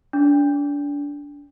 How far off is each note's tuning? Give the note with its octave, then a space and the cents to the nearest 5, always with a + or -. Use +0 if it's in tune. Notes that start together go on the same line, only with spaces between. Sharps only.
D4 -30